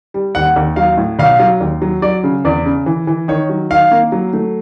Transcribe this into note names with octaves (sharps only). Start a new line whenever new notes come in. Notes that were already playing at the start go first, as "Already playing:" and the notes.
G3
D#2 F#5
D#2
F#3 F5
A2
B1 F5
F#3
D#2
F#3
F#3 D5
C#3
E2 D5
C#3
E3
E3
D#3 C#5
F#3
D#3 F5
A#3
F#3
A3